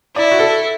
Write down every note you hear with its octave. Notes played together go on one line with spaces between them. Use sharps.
E4 D5
F#4
A4